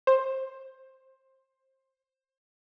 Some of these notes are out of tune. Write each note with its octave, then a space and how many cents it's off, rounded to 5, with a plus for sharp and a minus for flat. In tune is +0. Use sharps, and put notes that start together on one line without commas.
C5 +15